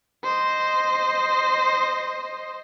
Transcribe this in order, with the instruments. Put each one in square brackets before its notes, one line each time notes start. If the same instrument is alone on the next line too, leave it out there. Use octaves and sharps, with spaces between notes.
[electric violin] C5 D#5